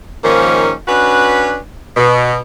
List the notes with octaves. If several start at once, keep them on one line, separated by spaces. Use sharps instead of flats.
G#2 D#3 F3 A#3 C#4
C#4 D4 F#4 B4
B2